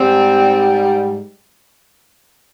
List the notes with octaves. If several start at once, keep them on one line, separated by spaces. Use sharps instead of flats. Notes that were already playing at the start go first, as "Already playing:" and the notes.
Already playing: G#2 G3 C4